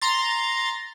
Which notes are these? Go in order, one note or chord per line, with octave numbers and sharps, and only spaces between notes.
A#5 C6 A6